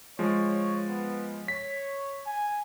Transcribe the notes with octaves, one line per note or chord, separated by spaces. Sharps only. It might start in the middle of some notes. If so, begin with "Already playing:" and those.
F3 G#3 C#5
B3
C#5 B6
G#5